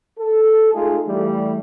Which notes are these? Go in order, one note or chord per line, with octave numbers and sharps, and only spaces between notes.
A4
G#3 A3 D#4 F4 G#4
E3 G3 A3